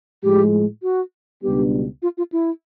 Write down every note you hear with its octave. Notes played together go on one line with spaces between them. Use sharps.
A2 F3 G#3 G4
F#4
C#2 B2 G3 B3 D4 G4
F4
F4
E4